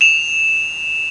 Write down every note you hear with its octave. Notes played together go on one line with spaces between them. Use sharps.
E7 F7